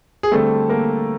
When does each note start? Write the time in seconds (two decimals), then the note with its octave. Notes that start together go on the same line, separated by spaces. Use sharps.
0.23 G#4
0.31 D3 G3 A3 C4 A4
0.69 A#3 A#4